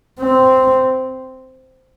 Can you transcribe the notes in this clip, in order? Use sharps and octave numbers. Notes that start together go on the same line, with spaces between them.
C4